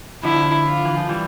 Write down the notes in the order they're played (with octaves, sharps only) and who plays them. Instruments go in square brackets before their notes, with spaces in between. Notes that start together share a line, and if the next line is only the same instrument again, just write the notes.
[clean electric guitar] D3 F3 [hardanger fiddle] E4
[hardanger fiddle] F4
[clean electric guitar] E3
F3
E3 G3